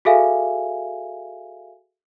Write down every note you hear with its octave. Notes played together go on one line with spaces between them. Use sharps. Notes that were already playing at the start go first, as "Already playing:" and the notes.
F#4 G#4 A4 E5 F5 G#5